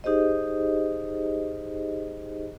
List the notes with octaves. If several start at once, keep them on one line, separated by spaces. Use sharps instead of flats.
D#4 G4 G#4 C5 D#5